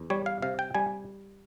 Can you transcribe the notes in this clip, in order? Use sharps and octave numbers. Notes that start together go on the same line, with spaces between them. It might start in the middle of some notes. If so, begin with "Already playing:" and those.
Already playing: E2
G3 C#5
F5
C3 F5
G5
G3 G#5